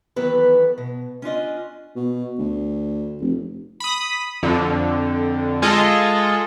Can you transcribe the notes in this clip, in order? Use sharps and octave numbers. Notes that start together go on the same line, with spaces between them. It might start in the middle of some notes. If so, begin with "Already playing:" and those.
D#3 E3 F#3 B3 A4 B4
B2
C#4 D4 F4 D#5
B2
D2
F1
B5 D#6
F2 D3
G#3 F4 G#4 A4 D#5